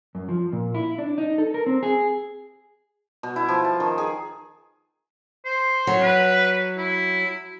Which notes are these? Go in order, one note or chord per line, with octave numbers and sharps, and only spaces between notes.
F#2
F3
A#2
E4
D4
D#4
A4
A#4
C4
G#4
B2
E4
F3
A5
D#3
G#4
C5
F#3
B4
E4